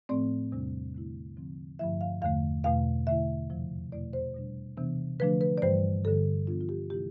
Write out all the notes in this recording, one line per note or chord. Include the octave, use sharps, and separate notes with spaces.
A2 F3 A3 C4 D5
E2 C3 G3 D4
D3 A3 E4
D3 F3 C4
G2 D3 F3 A3 E4 E5
F5
E2 D3 A3 F5
E2 B2 A3 F5
D3 A3 E4 E5
F2 C3 F3
E2 B2 A3 E4 D5
C5
B2 G3 D4
C3 E3 B3 D4
D3 F3 A3 D4 B4
B4
D5
G2 E3 G3 C5
G2 D3 G3 A4
G2 F3 B3 D4 F4
F4
G4
C3 E3 A3 E4 G4